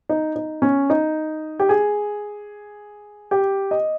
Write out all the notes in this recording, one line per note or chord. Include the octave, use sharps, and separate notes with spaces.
D#4
D#4
C#4
D#4
G4
G#4
G4
D#5